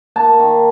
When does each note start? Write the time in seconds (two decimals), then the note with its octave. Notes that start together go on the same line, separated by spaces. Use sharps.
0.16 A#3 A5
0.40 D#3